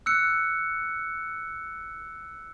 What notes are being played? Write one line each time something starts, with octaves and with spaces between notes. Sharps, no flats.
E6 F#6 C#7